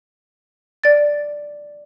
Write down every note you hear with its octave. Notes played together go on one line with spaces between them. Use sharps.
D5 A6